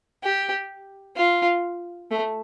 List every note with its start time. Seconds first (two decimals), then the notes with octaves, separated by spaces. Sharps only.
0.23 G4
1.16 F4
2.11 A3